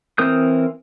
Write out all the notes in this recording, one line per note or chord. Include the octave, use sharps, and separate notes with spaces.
E3 C4 A#4 D#6 G6